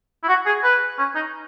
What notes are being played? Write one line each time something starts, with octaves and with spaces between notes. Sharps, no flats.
E4
F#4
G#4
B4
C#4
D#4